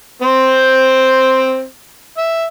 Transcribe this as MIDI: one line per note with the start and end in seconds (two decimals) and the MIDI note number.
0.22 1.65 60
0.22 1.65 72
2.18 2.45 76